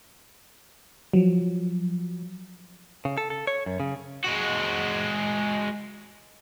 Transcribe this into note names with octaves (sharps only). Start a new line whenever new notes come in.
F3 F#3
C#3
A4
A4
C#5
F#2
C#3
G#3 F#4